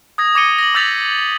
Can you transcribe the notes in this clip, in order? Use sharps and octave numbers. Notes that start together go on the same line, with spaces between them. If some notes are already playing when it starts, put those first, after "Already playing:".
D#6 G#6 A#6
D6 G#6 A#6 C#7 D#7 G7
A#6 F#7
D6 E6 G6 A6 B6 F7